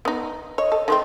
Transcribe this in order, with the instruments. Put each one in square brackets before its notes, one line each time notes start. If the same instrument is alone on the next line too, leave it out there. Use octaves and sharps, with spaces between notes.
[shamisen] B3 D#4
[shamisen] C#5 [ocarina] D#5
[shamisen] A4
[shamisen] D#3 A3 C4 [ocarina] C6